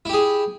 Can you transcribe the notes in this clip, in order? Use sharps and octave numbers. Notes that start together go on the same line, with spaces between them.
E4 G4 G#4